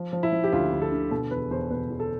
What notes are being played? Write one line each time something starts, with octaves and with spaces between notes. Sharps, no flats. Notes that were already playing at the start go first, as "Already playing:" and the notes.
Already playing: F3
F3
E4
F3
G4
D2 F4
D2
A4
D3
B2 A4
E2 B4
E2 C5
B2 B4
E2
A4